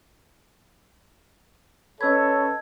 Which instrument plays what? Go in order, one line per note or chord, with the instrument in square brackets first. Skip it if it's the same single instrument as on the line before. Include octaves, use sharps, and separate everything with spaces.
[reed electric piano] C#4 B4 B5 [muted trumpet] A4 [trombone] C#5 [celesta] D#5 E6 G#6